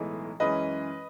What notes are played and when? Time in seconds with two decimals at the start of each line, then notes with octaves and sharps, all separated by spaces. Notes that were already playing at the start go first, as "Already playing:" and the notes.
Already playing: B1 A2 E3 G#3 D#4
0.40 F#2 E3 G#3 C#4 B4 D#5